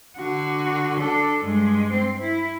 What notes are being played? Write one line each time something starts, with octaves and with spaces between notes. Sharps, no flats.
D3 F#4
D4 A4
G2 G#3
C4
E4